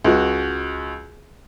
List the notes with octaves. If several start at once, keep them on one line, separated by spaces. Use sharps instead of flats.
C#2 F#4